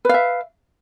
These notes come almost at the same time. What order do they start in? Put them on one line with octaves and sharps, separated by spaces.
B4 F5 E5